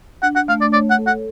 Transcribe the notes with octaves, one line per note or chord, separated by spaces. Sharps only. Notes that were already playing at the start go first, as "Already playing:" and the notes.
D4 F#5
F#5
A3 F5
D5
C#5 D5
F#5
A4
F#5